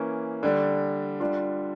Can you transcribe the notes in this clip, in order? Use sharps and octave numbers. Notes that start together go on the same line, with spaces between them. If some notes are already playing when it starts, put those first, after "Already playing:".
Already playing: E3 A#3 C#4
D3 G3 D4
D3 G3 D4 F4